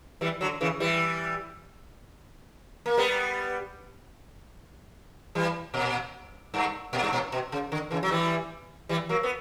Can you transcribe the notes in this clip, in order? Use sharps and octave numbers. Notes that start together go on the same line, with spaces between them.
E3 G3
D3 F#3
C#3 E3
E3 G3
A#3
G3 B3
E3 G3
A#2
G2
A#2
G2
A#2
B2
C#3
D3
C#3 E3
F#3
E3 G3
E3 G3
F#3 A#3
B3